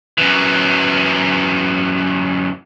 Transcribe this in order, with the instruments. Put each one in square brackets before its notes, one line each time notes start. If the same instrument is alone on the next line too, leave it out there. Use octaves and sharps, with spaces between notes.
[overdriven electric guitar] F#2 E3